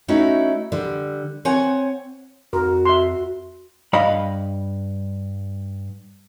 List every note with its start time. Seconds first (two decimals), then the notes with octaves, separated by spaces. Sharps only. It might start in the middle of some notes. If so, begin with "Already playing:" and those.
0.08 A3 C#4 D#4 E4 F#4
0.72 D3 G3
1.45 C4 C#5 F#5 G#5
2.53 F2 F#4 A#4
2.85 E5 C6
3.93 G2 D#5 F5 B5